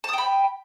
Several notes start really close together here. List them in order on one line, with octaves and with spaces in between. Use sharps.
A5 D#6 G5 B5